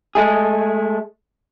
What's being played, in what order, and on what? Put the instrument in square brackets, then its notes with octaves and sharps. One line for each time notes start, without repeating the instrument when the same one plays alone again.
[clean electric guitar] G#3 A3 G#4